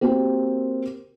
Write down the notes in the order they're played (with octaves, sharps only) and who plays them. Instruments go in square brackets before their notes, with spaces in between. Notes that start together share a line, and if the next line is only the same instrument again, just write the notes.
[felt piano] A#3 C4 F#4 G4 A#4